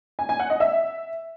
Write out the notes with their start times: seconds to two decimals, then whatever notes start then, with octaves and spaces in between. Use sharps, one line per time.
0.19 G#5
0.29 G#5
0.39 F#5
0.50 D#5
0.60 E5